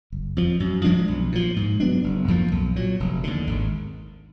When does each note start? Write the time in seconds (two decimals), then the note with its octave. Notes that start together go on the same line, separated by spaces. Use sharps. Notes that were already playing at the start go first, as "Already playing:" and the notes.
0.12 F#1
0.37 F2 F3
0.60 F#2
0.84 F3 G#3 D4
1.08 B1
1.32 A#2 F3
1.56 G#2
1.80 F#3 B3 D4
2.04 F#1
2.28 F2 F3 A#3
2.52 B1
2.76 A#2 F#3
3.00 F1
3.24 D#2 D3
3.47 G#1